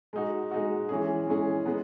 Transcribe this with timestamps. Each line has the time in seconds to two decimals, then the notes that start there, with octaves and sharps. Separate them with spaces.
0.13 G#3 D#4 F#4
0.51 G#3 D#4 F#4
0.89 E3 G#3 C#4 G#4
1.27 E3 G#3 C#4 G#4
1.66 G#3 B3